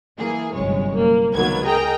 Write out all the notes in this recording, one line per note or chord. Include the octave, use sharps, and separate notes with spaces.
E3 A#3 G#4
G1 C2 F#2 G#3 C#5
A#3
C#2 D#3 F#3 A#3 B3 G#6
G#4 A#4 D#5 G5 A#5